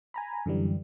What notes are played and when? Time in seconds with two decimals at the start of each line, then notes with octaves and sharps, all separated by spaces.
0.14 G#5 A#5 B5
0.46 F#2 D3 E3 G3